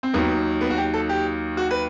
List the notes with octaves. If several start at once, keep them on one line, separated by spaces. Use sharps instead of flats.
C4
D#2 D#3 F#3 B3
B3
F#4
G4
A4
G4
F#4
B4